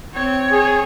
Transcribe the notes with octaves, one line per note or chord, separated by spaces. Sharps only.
C4 C#5
G#4